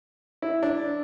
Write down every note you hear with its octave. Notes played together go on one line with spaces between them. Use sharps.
E4
D4